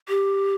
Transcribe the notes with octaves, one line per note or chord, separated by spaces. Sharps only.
G4